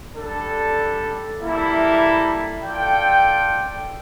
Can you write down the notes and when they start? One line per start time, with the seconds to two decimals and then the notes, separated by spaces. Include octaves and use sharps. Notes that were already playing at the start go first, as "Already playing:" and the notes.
0.15 G3 D4 A4
1.38 G3 A#3 E4 A4
2.62 F4 A4 D5 G5